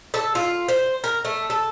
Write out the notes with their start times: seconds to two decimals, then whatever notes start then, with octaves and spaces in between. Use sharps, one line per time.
0.14 A4
0.35 F4
0.69 C5
1.04 A#4
1.25 A3
1.50 A4